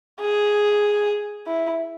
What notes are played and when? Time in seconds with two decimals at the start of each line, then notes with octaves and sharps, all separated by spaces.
0.20 G#4
1.47 E4